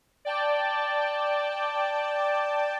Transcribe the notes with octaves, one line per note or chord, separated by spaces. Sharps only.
D5 G5 A5